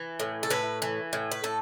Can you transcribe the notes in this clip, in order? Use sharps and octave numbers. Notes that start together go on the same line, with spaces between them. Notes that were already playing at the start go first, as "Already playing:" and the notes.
Already playing: E3
A2
A4
A2 B4
E3
A2
B4
A2 A4